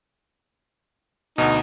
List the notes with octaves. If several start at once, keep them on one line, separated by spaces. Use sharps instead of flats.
D2 B2 D#4